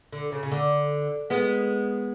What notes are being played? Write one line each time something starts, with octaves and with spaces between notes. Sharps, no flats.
D3
C#3
C#3
D3
G#3 B3